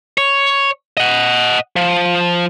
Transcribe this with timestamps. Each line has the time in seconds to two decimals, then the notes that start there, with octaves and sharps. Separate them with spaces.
0.18 C#5
0.97 D#5 F#5
1.76 F3